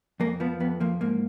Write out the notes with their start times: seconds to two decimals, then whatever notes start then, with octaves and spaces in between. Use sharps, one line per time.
0.20 F2 A#3
0.40 F3 B3
0.60 F2 B3
0.80 F3 A#3
1.01 G#2 A#3